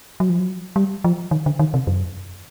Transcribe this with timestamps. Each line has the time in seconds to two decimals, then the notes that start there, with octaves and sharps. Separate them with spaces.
0.20 F#3
0.29 F3
0.40 F#3
0.76 G3
1.04 F3
1.31 D#3
1.46 D3
1.59 D#3
1.74 C3
1.87 F#2